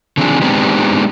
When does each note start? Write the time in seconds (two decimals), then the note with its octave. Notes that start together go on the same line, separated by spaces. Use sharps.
0.17 D3 D#3 F3 C4 D4 G#4
0.42 G#3 B3 C4 D4 D#4 G4